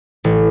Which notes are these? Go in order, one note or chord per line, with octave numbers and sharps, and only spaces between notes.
A1